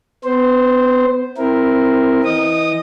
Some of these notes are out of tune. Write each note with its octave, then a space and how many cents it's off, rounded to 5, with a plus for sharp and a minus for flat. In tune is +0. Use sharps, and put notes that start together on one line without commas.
B3 +35 C5 +0
C4 +0 E4 +0 A#4 +0
E3 -20 D#5 +0 D#6 -20